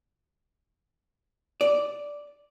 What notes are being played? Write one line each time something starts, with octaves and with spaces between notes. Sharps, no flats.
D5